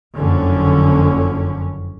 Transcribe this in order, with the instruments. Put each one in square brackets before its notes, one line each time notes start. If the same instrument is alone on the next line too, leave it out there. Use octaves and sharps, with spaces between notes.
[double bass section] F#1 F2 D3 C#4